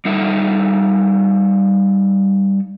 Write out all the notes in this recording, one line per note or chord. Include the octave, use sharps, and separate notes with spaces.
G3 D#4 A4 E5